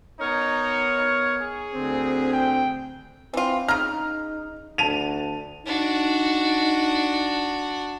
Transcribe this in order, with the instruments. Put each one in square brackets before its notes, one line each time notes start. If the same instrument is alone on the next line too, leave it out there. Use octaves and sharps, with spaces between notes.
[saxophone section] B3 A#4 C#5 [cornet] D#4
[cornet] D#4
G#4
[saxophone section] D2 D3 C4
[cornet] G5
[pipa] E3 F4 [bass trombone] C4
[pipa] C#3 A#5 [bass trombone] D#4 [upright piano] F6
[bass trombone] D2 [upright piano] A5 D#7 F7
[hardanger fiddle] D4 F#4 [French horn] D#4